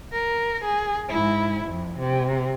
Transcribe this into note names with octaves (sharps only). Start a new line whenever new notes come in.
A#4
G#4
G#2 E4
F2
C3